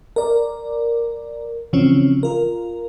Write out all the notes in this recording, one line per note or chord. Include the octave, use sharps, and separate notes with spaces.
A#4 D5
C#3 E3 F3 C4 C#4
F4 A#4